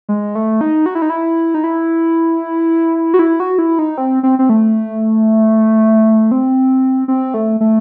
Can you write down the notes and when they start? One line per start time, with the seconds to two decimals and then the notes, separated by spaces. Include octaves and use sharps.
0.09 G#3
0.35 A3
0.61 D#4
0.86 F#4
0.95 E4
1.02 D#4
1.10 E4
1.54 D#4
1.64 E4
3.14 F#4
3.19 E4
3.40 F#4
3.59 E4
3.79 D#4
3.98 C4
4.23 C4
4.39 C4
4.49 A3
6.31 C4
7.08 C4
7.34 A3
7.60 A3